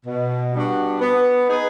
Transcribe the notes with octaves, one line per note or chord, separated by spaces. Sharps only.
B2
G3 B3 D4 F#4
B3
D#4 G#4 B4